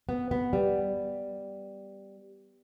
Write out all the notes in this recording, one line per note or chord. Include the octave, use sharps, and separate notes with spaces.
B3
B3
G3